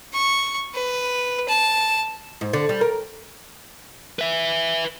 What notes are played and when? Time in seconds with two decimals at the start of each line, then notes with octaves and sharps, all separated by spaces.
0.14 C#6
0.75 B4
1.49 A5
2.41 G#2
2.53 D3
2.69 G3
2.81 A#4
4.19 B4 E5